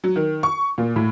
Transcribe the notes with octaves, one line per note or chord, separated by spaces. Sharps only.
F#3
D#3
C#6
A#2
A2